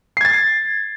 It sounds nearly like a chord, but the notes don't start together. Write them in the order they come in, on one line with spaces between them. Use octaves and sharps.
C7 G#6 A6